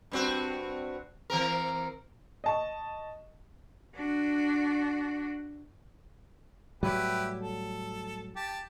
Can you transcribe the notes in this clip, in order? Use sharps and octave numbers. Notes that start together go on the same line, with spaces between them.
G2 C4 F#4
E3 C4 A#4
D#5 A5 C#6
D4 F#4
A2 F#3 G3 E4 G4 B4
A4
G4 A5